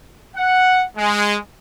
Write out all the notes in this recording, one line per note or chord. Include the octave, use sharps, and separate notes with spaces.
F#5
G#3